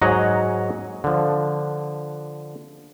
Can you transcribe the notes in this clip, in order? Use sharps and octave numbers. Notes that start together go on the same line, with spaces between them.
G#2 F#3 D#5 F#5 G#5 A#5
D3 F3